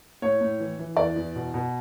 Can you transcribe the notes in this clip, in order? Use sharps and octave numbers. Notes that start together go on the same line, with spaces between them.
A2 C#5
A2
E3
E3
E2 D5
E2
B2
B2